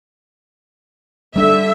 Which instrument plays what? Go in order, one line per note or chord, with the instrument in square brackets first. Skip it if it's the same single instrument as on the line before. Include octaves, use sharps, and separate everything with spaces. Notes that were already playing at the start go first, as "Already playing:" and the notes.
[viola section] D3 E5 [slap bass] G3 D4